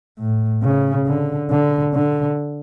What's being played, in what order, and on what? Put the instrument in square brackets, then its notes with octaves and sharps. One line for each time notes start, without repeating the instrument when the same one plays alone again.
[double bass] A2
C#3
D3
D3
D3